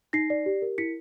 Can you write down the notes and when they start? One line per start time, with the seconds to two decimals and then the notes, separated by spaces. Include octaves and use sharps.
0.13 D#4 A#6 C7
0.30 D5
0.46 G4
0.62 A#4
0.78 E4 B6 C#7